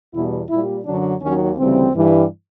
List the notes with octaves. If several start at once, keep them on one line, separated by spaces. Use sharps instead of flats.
E2 B2 G3 E4
A#2 G3 E4
F#2 D3 F#3 D4
D#2 D#3 F#3 C#4
D2 C#3 E3 G3 C4
G2 E3 G3